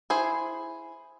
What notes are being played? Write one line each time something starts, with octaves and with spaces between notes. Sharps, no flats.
E4 G#4 C5